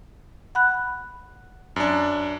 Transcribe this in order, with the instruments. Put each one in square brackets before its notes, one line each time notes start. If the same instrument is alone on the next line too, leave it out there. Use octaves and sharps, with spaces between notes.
[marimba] F#5 B5 F#6
[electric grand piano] F#2 D4